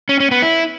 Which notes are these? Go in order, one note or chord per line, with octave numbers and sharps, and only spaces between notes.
C#4
C#4
B3
E4